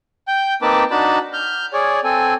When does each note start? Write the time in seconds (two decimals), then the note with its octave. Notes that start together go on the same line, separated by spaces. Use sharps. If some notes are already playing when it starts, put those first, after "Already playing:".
0.28 G5 G6
0.62 A#3 C4 D#4 B4 A5 D6
0.91 D4 D#4 F#4 A5 B5
1.33 F6 G6
1.73 G#4 C#5 D5
2.04 C4 A4 G#5